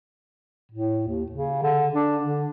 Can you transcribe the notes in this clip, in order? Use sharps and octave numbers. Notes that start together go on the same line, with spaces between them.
A2
D#2
C#3
D3
D4
D3